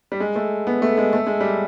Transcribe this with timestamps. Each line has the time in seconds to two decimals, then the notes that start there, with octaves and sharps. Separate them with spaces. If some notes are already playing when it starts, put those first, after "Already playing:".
0.12 G3
0.20 G#3
0.36 A3
0.67 B3
0.82 A3
0.98 G#3
1.13 A3
1.27 G#3
1.41 G3